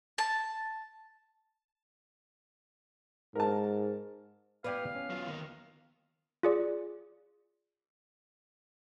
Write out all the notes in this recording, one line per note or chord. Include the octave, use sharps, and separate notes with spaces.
A5
G#2 A#4 A5
B3 E4 G4 B4 D5 F5 G5
C#4
F#3 F4
D#3 A#3
F4 G#4 D5